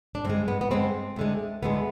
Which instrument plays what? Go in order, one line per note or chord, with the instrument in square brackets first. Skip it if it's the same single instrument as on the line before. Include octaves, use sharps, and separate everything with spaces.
[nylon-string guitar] D4
G2 D3 G#3 C4
B3
B3
G2 D3 G#3 C4
D2 D3 G#3
D2 D3 G#3 B3